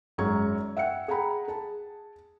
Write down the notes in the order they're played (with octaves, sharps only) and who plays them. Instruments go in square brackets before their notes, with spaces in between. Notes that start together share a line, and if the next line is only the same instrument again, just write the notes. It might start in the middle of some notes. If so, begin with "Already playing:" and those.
[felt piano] G#1 F#2 G#4 A#5 C#6 G#6
E5 F#5 G5 C#7
G#4 F#5 G5 A#5 B5
G#4 A5